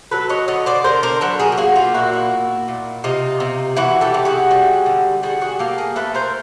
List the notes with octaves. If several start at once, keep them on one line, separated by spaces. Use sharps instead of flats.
F#3 A4 B4
C#5 D#5
D3 C#5 D#5
C5 D5
D3 A#4 C5
A#4 C5
F#3 A4 B4
G#4 A#4
G4
A#3 F#4 G#4
F4 G4
A#2 E4 F#4
E4 F#4
A#2
A#2
C3 D#4 F4
C3
E3 E4 F#4
G4 A4
C3
F#4 G#4
G3
D3
G3 F#4 G#4
F#4 G#4
A#3 G4 A4
G#4 A#4
A3 A4 B4
A#4 C5